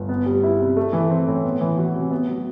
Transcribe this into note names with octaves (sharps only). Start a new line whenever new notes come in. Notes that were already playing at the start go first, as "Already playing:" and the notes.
Already playing: G1
B3
G3
E4
C3
A3
E3
C4
A2
B3
E3
F#4
C3
B3
F#3